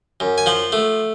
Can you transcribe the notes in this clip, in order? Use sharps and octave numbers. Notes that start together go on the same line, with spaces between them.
F#2
G#5
F3 F#5
A3